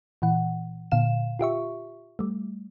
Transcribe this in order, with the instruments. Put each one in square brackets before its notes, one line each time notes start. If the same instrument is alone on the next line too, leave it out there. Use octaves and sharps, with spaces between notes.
[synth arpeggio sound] A#2 E3 F#5
A#2 D3 F5 E7
F4 G4 E5 C#6
G3 A3